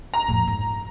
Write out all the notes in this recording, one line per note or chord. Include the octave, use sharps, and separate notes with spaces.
A#5
F2 A2
G#2